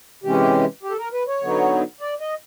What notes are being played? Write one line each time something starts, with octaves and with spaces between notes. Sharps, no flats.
C3 E3 G#3 C#4 G4
G4
A4
A#4
B4
C#5
D3 F#3 B3 D#4
D5
D#5